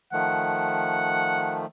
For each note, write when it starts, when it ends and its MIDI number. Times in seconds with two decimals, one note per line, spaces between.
0.13 1.66 51
0.13 1.66 53
0.13 1.66 57
0.13 1.58 78